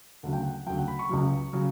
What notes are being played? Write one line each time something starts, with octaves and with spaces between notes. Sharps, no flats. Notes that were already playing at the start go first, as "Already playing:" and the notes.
D2 C#3 F#3 F#5
G5
F#5
D2 C#3 F#3 G5
F#5
B5
C#6
C#2 C#3 F#3
C#3 F#3